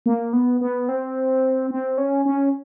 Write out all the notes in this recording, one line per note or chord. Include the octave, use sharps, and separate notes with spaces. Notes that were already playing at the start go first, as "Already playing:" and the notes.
A#3
B3
B3
C4
C4
C#4
C#4